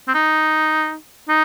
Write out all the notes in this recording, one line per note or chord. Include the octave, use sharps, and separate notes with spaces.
C4
D#4
D#4